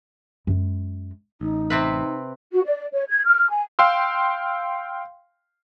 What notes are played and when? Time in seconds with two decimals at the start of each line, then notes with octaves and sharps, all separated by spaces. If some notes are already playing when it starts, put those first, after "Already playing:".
0.47 F#2 G#3
1.41 A1 D#4
1.70 C3 C4 B4
2.52 F#4
2.65 D5
2.93 C#5
3.09 G#6
3.25 F6
3.50 G#5
3.79 F5 G5 C6 E6